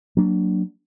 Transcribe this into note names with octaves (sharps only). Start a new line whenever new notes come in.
F#3 A#3 D4